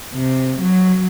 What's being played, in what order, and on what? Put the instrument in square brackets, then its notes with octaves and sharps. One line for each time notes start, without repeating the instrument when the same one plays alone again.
[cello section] C3
F#3